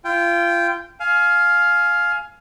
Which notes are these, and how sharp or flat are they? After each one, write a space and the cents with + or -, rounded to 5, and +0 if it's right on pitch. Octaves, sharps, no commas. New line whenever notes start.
F4 -30 G5 +0
F5 +5 G#5 +25